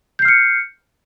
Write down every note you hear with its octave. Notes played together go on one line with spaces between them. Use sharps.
F6 G6 C7 C#7